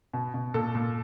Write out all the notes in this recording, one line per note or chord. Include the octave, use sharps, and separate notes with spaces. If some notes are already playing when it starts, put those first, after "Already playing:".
B2
B2
A#2 A4
A#2